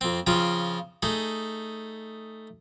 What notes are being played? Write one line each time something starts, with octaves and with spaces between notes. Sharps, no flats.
F2 C4
C#3 F3 C4 F4
A3 D#4 G#4